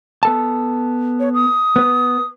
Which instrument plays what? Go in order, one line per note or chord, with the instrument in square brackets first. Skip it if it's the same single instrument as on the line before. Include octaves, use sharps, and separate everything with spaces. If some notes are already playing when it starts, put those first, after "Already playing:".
[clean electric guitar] B3 A4 A5
[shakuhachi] C#5
D#6
[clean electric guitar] B3 B4